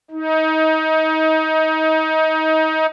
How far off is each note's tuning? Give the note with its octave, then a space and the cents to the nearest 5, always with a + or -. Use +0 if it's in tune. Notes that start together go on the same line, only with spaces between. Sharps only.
D#4 +25